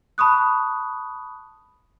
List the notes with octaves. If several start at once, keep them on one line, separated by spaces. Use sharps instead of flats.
A5 B5 C#6 D#6 F#6